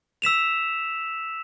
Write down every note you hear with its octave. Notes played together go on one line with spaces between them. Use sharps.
E6 B6 E7 F7